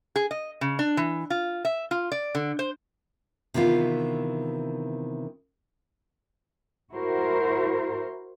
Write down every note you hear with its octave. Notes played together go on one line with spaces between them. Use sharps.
G#4
D#5
C#3
D4
E3
F4
E5
F4
D5
D3
C5
C3 D#3 E3 B3 F4
E4 F#4 A#4 C5